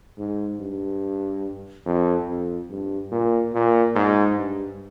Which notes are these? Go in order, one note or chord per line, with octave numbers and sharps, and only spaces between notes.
G#2
G2
F2
F2
G2
A#2
A#2
G#2
G2